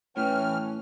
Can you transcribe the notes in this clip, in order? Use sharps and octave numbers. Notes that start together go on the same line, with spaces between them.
A2 E3 C#4 G5 F6